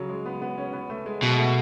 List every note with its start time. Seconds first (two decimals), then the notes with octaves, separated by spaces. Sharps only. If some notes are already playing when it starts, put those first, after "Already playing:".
Already playing: C#3 F#3
0.09 G#3
0.26 B3
0.42 B3
0.58 C#4
0.73 B3
0.90 A3
1.06 G#3
1.22 B2 F#3
1.38 A3